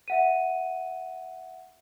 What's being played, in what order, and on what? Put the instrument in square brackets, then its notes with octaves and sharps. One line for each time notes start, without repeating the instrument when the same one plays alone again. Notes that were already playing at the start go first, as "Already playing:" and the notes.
[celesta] E5 F#5 D#7